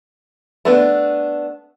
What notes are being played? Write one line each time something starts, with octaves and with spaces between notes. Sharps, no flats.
A3 B3 D4